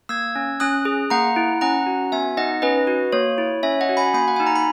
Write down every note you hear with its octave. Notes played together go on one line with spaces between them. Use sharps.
A#3 E6 G#6
C#4
C#4 D#6 F#6
G#4
A#3 F#5 A#5
E4
C#4 F#5 A#5
F#4
B3 E5 G#5
D#4 D#5 F#5
C#4 B4 D#5
F#4
A#3 C#5
E4
C#4 C#5 E5
D#5 F#5
F#4
G#5 B5
A#3 G#5 B5
F#5
D#4 G#5
A#5
B5